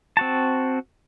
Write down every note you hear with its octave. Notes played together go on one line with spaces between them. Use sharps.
C4 F#4 A5